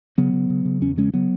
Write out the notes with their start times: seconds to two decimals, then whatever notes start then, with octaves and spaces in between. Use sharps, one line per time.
0.18 C#3 F#3 B3
0.33 C#3
0.50 C#3
0.65 C#3
0.82 E2 C#4
0.97 C#3 G#3 C#4
1.14 C#3 F#3 B3